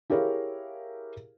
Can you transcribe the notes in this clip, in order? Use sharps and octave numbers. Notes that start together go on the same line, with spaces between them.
E4 G4 G#4 A#4 C#5 F5